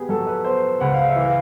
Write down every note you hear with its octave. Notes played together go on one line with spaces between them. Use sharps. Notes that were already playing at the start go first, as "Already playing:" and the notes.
Already playing: B3 G4 G#4
F#3 A4
B4
B3 C5
C#2 F#5
F5
E5
E3
F5